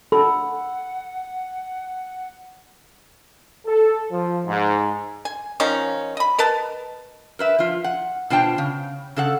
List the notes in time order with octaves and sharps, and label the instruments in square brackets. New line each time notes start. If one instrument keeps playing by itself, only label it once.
[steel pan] A4 [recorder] F#5 [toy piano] B5
[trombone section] A4
F3
G#2
[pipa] G#5
D#3 F3 C#4 D#4
D#5 B5
A#4 B4 D#5 A5
[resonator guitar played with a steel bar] A#4 B4 E5
F3 F4
F#5
B2 D4 F4 C5 G5 A5
C#3
C#3 A4 F#5